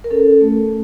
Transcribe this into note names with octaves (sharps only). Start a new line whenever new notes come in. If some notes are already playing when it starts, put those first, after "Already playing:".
A#4
C#4 A4
A3